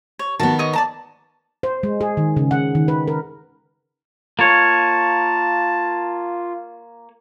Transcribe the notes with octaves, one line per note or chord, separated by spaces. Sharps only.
C#5
D#3 B3 F#4 A5
C#5 D#5 D#6
D5 A5 A#5
C5
G#3
G#4
D#3
C#3
F#5
D#3
B4
A#4
A#3 F4 C#5 A5